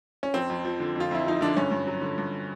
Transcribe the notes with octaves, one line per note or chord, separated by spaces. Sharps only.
C#4
F2 C4
F2
F3
D3
F2 F4
F2 E4
F3 D#4
D3 D4
G2 C#4
G2
F#3
D3
G2